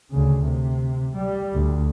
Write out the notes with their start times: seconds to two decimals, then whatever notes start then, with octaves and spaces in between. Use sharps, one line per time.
0.11 D2 C#3
0.45 C3
1.16 G3
1.53 D2